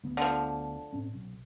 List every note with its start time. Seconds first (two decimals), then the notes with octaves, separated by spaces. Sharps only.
0.04 D2 B3
0.17 D3 F3
0.93 A2 C4 C#4
1.14 B1